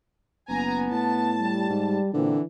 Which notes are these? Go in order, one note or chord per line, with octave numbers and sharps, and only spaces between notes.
F#1 B3 G#5 A#5
A2 A5
G3
G#2
A#2 D3 E3 C4